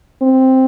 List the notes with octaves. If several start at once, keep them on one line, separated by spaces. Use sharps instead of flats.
C4